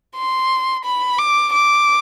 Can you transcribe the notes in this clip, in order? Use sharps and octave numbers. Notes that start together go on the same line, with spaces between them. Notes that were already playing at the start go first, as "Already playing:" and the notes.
C6
B5
D6
D6